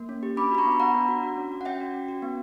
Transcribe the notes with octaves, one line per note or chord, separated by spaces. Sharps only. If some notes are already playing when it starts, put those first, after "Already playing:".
Already playing: A#3
C#4
G4
D4 B5 D6
F#4 B5
A#5 C#6
B3
B5
B3 F#5 A#5
D4
F#4
F#4
C#4
F#4
F#5
C#4 E5 G5
F#4
C#4
F#4
B3